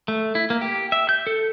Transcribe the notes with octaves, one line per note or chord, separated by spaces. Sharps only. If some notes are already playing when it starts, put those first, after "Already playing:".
A3
E4
A#3
G4
E5
G6
A4